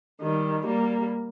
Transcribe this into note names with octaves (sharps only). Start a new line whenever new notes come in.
D#3 G3
G3 A#3